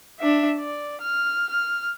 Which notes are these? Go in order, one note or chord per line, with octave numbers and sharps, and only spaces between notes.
D4 E5
D5
F6
F6